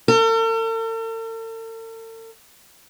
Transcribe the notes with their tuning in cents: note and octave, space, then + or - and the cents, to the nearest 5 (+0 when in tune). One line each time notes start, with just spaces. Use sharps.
A4 +45